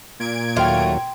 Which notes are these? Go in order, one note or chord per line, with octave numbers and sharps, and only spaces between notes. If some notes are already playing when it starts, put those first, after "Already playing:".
A#2 G#6 D7
D#2 F#3 A3 F5 G5 C6